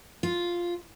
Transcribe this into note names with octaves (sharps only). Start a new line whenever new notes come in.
F4